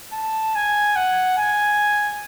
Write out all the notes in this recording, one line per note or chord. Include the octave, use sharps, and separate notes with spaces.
A5
G#5
F#5
G#5